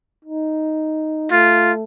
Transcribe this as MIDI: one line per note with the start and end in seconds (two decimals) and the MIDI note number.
0.25 1.31 63
1.31 1.83 57
1.31 1.72 65